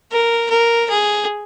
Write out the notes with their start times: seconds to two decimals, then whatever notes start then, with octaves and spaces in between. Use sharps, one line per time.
0.12 A#4
0.50 A#4
0.90 G#4